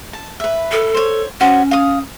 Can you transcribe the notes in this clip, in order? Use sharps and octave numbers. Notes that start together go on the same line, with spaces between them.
A5
B4 E5
A4
C5 C#5
C#4 F#4 C5 C#5
F5 D#6